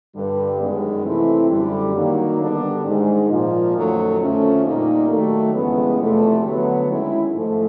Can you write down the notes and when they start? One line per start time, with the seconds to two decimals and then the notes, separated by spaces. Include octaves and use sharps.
0.15 G2 D3 G3
0.60 F#2 D#3 G#3 B3
1.05 C3 E3 A3 C4 E4
1.50 F#2 D3 G3
1.95 D#3 F#3 A#3
2.40 D3 G3 B3 D4
2.85 G#2 D#3 G#3
3.30 A#2 F3 A#3
3.75 F#2 D#3 F#3 A3
4.19 F2 D3 F3 A3 C#4
4.65 A#2 G3 A#3 D#4
5.10 D#3 F#3 A3
5.55 F2 C#3 E3 G#3 B3
6.00 E2 C3 F3 A3
6.45 D3 F#3 B3
6.90 D#3 G#3 C#4 E4
7.35 G#2 F3 A3